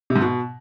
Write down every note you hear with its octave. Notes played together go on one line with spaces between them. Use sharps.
C3
G#2
B2